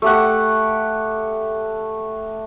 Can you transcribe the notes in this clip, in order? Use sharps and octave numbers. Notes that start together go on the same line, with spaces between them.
A3 G4 F#5